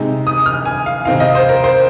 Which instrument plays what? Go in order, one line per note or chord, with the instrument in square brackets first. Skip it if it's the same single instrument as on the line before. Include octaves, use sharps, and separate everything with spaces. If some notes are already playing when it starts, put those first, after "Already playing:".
Already playing: [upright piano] C3 G#3 D#4
D#6
F6
G#5
F5
C3 D#3 C4 D#4 F5
D#5
C5
A#4
C5